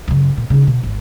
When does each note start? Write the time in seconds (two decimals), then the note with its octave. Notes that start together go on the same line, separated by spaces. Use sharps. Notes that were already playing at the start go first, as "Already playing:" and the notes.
0.08 F#2 C#3
0.37 A#2
0.50 C#3 D#4
0.67 B2
0.83 G#1